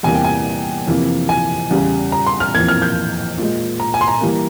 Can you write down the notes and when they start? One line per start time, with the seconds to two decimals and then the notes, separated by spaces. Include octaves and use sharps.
0.03 E2 C3 E3 G3 A#3 G#5
0.14 G5
0.24 G#5
0.87 F2 C3 E3 A#3
1.29 G#5
1.70 E2 C#3 G3
2.12 A#5
2.26 C6
2.40 F6
2.54 F2 E3 A#3 G#6
2.68 F6
2.82 G6
3.38 A#2 G#3
3.80 A#5
3.94 G#5
4.01 C6
4.08 A#5
4.21 E3 G3 A#3